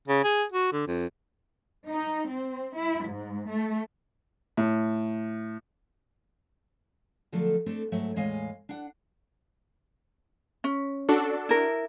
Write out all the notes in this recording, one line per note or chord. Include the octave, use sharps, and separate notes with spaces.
C#3
G#4
F#4
D3
F2
D#4
C4
E4
G#2
A3
A2
D3 F3 F#3 A3 A4
A3 C4 D4 A4
G#2 F#3 A3 E5
E2 A2 G#3 D#5 F5 G#5
D4 F#5
C#4
D4 F#4 A4
E4 A#4